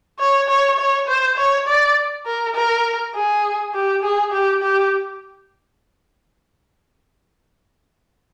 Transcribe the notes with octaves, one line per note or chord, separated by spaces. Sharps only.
C#5
C#5
C#5
C5
C#5
D5
A#4
A#4
G#4
G4
G#4
G4
G4